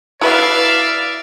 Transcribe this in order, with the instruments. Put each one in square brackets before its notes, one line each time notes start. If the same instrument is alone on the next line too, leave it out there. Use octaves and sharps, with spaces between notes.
[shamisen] E4 F#4 B4 [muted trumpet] D5 [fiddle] E5 F5